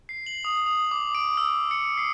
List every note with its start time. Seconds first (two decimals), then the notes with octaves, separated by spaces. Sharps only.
0.09 C7
0.26 F#7
0.45 D#6
0.66 D#6
0.91 D6
1.15 D7
1.37 E6
1.71 C#7
1.97 C7